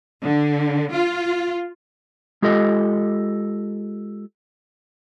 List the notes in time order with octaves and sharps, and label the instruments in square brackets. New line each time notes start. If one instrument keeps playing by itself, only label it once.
[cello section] D3
F4
[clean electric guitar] G#3 F4 G4 A4 D#5